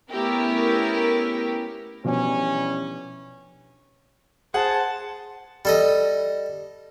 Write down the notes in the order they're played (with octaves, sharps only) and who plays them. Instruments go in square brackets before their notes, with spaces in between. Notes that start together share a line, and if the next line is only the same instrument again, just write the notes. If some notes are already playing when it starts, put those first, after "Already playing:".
[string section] A3 B3 C#4 E4 G4 A#4
[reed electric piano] B2 F3 D4 [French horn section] E3 G3 C#4
[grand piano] G#4 F#5 [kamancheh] C5 A5
[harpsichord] G3 A4 D#5